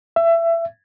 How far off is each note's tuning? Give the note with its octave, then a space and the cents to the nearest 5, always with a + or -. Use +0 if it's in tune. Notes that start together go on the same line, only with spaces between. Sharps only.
E5 +25